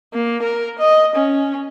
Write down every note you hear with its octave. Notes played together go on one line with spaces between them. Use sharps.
A#3
A#4
D#5
C#4